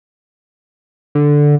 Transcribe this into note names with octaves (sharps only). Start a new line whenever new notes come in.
D3